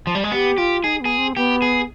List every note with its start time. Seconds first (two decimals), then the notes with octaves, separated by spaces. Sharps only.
0.07 F3
0.15 G3
0.24 G#3
0.32 B3 G4
0.58 F4 G4
0.84 D#4 G#4
1.01 B3 G#4
1.18 C4
1.36 B3 G4
1.62 G#4